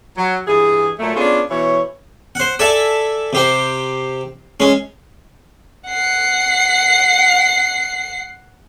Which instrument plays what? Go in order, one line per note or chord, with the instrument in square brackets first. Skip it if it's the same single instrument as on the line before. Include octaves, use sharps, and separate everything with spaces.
[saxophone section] F#3
G2 E3 G#4
A#2 F#3 A3
B3 C#4 D4 F4 G#4
B2 E3 C#5
[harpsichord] C5 F#5
A4 D5 E5 G#5 A5
C3 G4 C5
G#3 C#4
[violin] F#5 C7